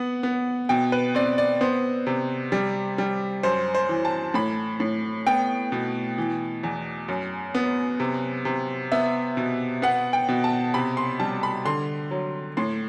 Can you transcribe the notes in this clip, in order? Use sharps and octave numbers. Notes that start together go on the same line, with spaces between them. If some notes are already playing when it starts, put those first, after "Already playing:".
Already playing: B3 F#5
B3
B2 G5
B4
C4 D5
D5
B3 C5
C3
G3
G3
F#2 C5
C5
E3
A5
A2 B5
A2
B3 G5
B2
E3
E2
F#2
B3
C3
C3
B3 E5
B2
B3 F#5
G5
B2
A5
C3 B5
C6
G3 A5
B5
D3 C6
F#3
A2 C6